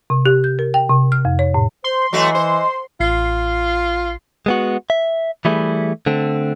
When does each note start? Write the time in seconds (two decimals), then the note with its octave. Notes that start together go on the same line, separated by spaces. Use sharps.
0.10 C3
0.26 G4
0.44 G6
0.59 A#4
0.74 G5
0.89 C3
1.12 F6
1.25 F2
1.39 C#5
1.54 A2
1.84 C5 C6
2.13 E3 F#3 A3 F#4 D#5
2.35 C5
3.00 A1 F4 C7
4.46 G#3 B3 F#4
4.90 E5
5.45 E3 G3 A3 E4 G#4
6.06 D3 A3 C4